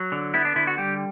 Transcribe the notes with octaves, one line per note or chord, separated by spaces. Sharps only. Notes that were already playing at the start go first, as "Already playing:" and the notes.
Already playing: F#3
D3
B3 E4
D4
D3 E4
F#4
G3 G4